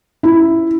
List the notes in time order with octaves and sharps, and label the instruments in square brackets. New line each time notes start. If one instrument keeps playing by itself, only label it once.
[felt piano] E4